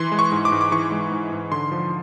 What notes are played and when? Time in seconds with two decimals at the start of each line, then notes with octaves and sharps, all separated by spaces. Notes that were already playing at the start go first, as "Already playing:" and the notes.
Already playing: E3 C6
0.12 G#3
0.19 C#6
0.32 G#2
0.45 D6
0.52 G#2
0.61 D6
0.72 E3 C#6
0.92 G#3
1.11 G#2
1.32 G#2
1.52 D3 C6
1.72 F3